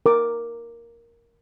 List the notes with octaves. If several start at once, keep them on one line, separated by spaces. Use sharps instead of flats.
A#4 D6